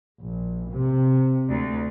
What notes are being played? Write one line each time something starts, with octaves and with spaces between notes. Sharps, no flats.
A#1
C3
D2